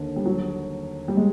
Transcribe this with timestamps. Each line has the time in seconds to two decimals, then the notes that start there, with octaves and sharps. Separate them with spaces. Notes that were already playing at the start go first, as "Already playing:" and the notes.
Already playing: D#2 D3
0.16 G3
0.26 F#3
1.08 G3
1.17 G#3